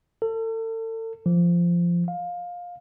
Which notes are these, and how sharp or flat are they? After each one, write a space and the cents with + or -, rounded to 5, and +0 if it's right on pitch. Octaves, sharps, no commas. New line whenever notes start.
A4 +35
F3 -15
F5 +20